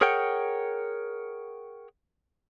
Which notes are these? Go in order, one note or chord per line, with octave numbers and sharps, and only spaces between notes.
G#4 A#4 C#5 F#5 G5